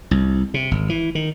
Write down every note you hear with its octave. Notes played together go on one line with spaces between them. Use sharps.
C2
C3
G#1
E3
D#3